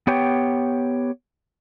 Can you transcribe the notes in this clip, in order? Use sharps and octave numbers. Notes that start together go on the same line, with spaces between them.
B3 G4 C#5 G5